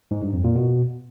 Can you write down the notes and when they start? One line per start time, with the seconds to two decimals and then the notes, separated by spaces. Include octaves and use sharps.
0.11 G#2
0.22 G2
0.33 F2
0.44 A#2
0.55 B2